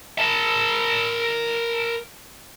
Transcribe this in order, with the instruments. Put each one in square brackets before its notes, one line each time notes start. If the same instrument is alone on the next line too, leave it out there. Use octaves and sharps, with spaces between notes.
[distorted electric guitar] A#4 A5